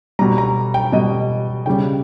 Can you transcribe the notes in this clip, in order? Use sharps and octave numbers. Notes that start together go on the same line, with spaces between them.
B2 G3 A#5
A#5
G5
B2 G3 D#5
C#3 G3 G5